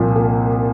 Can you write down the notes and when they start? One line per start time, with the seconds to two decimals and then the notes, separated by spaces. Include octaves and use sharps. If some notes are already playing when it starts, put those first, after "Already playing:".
Already playing: C2 A#2 F3
0.16 A#3